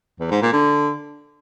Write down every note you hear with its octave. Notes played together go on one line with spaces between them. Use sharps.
E2
G#2
A#2
D3